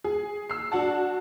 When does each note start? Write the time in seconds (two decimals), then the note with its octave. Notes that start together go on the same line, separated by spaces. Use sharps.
0.04 G#4
0.50 E6 C7
0.72 D4 F#4 F#5 A5